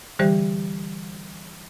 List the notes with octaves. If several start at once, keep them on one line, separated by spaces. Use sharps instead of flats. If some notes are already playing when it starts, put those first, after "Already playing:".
D3 E3 G3 G4 C5